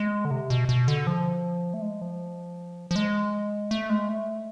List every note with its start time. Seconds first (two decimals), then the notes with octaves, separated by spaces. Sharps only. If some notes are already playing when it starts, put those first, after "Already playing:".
Already playing: G#3
0.25 D3
0.31 C3
0.50 B2
0.69 B2
0.88 D3
1.07 F3
1.74 A3
1.82 G#3
2.02 F3
2.91 F3
2.96 G#3
3.71 A3
3.90 G#3
4.09 A3